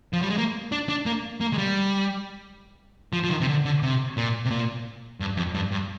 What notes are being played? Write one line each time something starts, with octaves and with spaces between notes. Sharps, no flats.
F3
G3
G#3
A#3
D4
D4
A#3
A#3
G#3
G3
F3
F3
D#3
C3
D3
D3
C3
A#2
C3
A#2
G2
F2
G2
G2